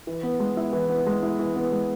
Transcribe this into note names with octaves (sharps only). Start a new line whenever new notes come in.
E3
B3
G#3
E4
E3
B3
G#3
E4
E3
B3
G#3